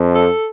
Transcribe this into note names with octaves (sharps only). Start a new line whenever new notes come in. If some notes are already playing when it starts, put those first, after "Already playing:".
Already playing: F2
A4